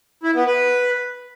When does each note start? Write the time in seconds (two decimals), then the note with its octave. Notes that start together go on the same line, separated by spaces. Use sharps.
0.23 E4
0.35 B3
0.47 B4